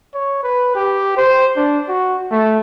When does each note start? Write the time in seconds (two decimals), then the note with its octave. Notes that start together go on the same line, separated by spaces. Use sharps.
0.14 C#5
0.43 B4
0.75 G4
1.17 C5
1.57 D4
1.89 F#4
2.31 A3